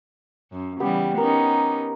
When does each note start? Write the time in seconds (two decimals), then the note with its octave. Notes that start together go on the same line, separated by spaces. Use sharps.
0.52 F#2
0.80 C#3 E3 G3 B3 G4
1.18 B3 C#4 D#4 A#4